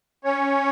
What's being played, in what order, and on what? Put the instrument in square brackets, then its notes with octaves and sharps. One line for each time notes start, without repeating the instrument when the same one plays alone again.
[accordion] C#4 C#5